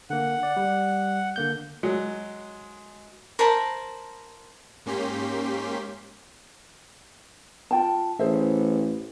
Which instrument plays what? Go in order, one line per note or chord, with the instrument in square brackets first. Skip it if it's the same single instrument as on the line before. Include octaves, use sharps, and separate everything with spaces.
[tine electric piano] D3 A#3 [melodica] F#5
[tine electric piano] D5
G3
D3 A#3 G6
[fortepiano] F#3 G#3
[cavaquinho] A#4 C5 A5 B5
[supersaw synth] G#2 A#3 C#4 G4 C6 B6
[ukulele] F4 G5 A5
[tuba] A1 [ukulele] G#4 C5 E5